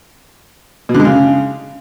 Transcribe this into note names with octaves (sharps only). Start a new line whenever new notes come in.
B2
D3
G#3
C#3